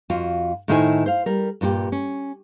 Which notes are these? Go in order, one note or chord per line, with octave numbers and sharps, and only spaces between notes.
F2 F4 F#4
A2 D#3 E4 C5 C#5 G#5
C5 F5
G3 A#4
G2 A#2 F#4 G4
C#4